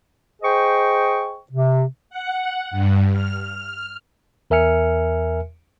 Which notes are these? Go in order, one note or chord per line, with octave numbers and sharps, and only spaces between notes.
G#4 C5 D#5 G5 C#6
C3
F#5
G2
F6
E2 A#4 E5 G#5 F6 C#7